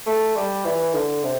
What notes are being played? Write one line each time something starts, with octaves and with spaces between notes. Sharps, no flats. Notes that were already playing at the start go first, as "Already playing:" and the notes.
A3
G3
E3
D3
C3